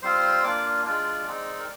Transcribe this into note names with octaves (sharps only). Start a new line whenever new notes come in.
G3 C4 F4 C5 C6
A#3 D4 F4 D5 D6
G#3 D4 F4 D5
G#3 C4 D#4
A#4